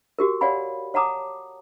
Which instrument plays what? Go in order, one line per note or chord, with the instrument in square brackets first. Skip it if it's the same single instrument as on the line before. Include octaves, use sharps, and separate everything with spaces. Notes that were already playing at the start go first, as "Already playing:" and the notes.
[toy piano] F#4 G4 A#4
C#5 D5 F5 F#5 G#5 B5
C#5 F#5 A5 A#5 D6 D#6